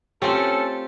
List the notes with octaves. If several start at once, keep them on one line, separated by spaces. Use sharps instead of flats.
A3 C4 C#4 F4 G4 A4